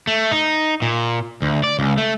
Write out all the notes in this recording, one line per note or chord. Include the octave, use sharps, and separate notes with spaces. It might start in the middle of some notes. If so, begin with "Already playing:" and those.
A3
D#4
A#2
D2
D5
C#2
A3